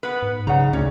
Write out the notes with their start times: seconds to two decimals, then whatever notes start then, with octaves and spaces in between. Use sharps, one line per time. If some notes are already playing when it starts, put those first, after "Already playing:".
0.03 B3 B4
0.22 G#2
0.47 B1 C#3 D#4 F#5 A#5
0.73 D2 C#3 C#4